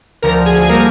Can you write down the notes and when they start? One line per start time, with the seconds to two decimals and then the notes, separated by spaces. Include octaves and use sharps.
0.22 D2 D3 F3 A#4 A#5
0.46 G#4 G#5
0.69 D3 G3 A#3 A#4 A#5